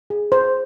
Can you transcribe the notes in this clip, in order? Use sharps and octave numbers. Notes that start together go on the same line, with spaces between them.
G#4
C5